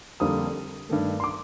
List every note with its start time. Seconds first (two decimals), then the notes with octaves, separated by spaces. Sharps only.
0.20 F2 D3 G3 A#3 D#6
0.89 G2 D#3 A3
1.20 C6
1.24 D6